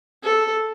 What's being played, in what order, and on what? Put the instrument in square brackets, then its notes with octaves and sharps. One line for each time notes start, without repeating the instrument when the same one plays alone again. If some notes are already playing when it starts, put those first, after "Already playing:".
[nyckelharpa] A4